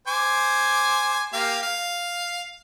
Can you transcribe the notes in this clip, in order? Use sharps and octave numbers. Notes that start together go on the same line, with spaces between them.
C5 G#5 D6
A#3 G4 F5
F5